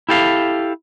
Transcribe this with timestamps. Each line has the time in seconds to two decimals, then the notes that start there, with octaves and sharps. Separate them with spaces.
0.09 E4 G4 A4 F5